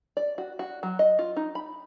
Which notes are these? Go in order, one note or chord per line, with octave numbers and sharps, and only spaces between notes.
D5
F#4
F#4
F#3
D#5
F4
D#4
B5